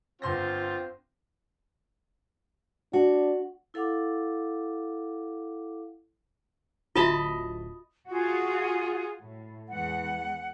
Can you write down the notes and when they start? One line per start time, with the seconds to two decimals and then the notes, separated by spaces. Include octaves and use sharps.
0.22 G1 C4 F4 C6 A#6
2.93 D4 F#4
3.74 E4 A4 F5 F#5 D6
6.96 D1 F4 F#4 D#5 E5 A5 B5
8.09 F4 F#4 G#4
9.21 A2
9.68 E2 E3 G#3 F#5